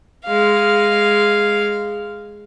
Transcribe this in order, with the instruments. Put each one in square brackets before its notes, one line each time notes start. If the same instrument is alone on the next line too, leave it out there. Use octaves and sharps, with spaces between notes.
[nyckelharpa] G#3 F5